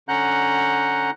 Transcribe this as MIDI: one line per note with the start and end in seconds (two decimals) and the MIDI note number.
0.08 1.11 50
0.08 1.11 61
0.08 1.11 78
0.08 1.11 82
0.08 1.11 90
0.08 1.11 91